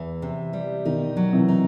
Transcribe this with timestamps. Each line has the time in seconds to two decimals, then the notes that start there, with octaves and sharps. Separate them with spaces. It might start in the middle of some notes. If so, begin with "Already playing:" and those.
Already playing: E2 E3
0.22 C3
0.53 G3
0.85 B2 D#3 D#4
1.17 F#3
1.33 C3 E3
1.48 D#4